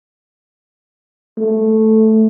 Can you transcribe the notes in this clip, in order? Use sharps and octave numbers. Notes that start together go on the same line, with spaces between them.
A3